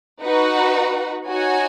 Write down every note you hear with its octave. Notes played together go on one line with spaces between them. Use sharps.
D#4 F#4 B4 F#5
D#4 F#4 C#5 G#5